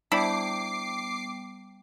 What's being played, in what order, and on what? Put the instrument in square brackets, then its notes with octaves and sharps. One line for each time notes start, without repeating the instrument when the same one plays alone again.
[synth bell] G3 B3 G5 [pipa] D4 E4 [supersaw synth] D6 C7